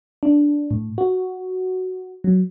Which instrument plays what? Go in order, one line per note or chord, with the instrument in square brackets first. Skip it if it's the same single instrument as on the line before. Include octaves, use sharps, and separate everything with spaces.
[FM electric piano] D4
A2
F#4
F#3